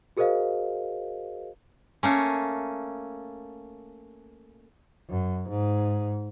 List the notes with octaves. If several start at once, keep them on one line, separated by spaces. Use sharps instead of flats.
F#4 G#4 A#4 C5 D#5 F5
A3 A#3 C#4
F#2
G#2